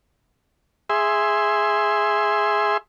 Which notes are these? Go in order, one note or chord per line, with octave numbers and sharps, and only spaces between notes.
G#4 E5 C6